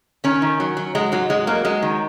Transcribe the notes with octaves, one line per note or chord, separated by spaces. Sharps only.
D#3 C#4
D#3
F#3
F#3
F#3 G#3
G#2 F#3
F#3 G#3
F#3 A#3
F#3 G#3
D#3